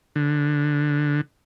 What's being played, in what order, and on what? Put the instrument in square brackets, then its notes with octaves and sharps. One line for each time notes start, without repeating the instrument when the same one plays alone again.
[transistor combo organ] D3